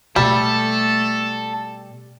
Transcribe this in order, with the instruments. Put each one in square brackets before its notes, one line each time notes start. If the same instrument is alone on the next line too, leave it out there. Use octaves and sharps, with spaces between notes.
[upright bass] B2 [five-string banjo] G3 [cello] A3 [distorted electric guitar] A4